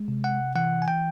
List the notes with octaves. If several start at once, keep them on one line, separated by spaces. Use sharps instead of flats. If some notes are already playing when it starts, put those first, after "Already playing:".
Already playing: G#3
C3
F#5
E3 F#5
G#5
G5